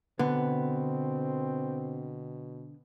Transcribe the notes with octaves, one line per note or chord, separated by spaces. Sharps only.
B2 D3 B3 C4